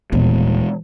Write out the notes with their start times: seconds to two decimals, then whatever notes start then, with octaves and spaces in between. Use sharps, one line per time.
0.12 D#1 E3 G#3 B3